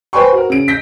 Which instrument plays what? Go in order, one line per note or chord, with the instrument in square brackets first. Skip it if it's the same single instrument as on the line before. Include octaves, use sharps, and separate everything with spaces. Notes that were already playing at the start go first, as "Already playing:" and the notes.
[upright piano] B4 C5 G5 G#5 C6 C#6
F#4 A#4
C#3 D7
G6 A#6 B6